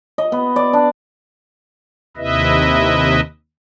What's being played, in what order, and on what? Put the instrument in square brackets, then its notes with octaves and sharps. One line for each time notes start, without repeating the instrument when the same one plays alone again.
[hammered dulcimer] D#5
B3
D5
D4
[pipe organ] D#2 C3 E4 B4 D#5 E5